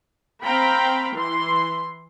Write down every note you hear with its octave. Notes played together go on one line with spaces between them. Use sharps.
C4 F5 G5 A#5 B5
E3 C6